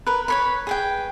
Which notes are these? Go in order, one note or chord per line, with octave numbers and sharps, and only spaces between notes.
A#4 B4
B4 C#5 B5
G#4 B4 G5